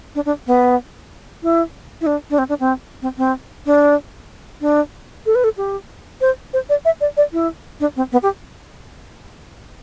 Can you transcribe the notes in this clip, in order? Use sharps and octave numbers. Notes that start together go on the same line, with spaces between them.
D4
D4
B3
E4
E4
D4
D4
C4
D4
C4
C4
C4
D4
D4
A4
B4
A4
G4
C5
C5
D5
E5
D5
D5
E4
D4
C4
B3
G4